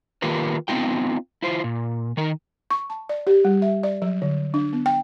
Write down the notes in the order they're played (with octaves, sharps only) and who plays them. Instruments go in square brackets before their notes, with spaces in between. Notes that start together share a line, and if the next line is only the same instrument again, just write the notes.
[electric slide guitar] D#3 A#3 F4 G4 A#4 B4
B3 C4 D#4 F4 G5
E4 F4 C5
A#2
D#3 D#4 A#4
[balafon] C#6
A5
D5
G4
G3
E5
D5
F#3
D3
D4
B3
G5